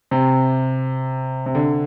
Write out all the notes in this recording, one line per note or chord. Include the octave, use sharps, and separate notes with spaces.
C3
C3
D3